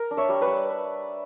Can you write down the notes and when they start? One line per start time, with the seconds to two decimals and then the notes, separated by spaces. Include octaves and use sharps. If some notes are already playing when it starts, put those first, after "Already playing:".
Already playing: A#4
0.11 D4
0.17 C#5 E5
0.29 G3
0.41 B4 D5
0.47 G3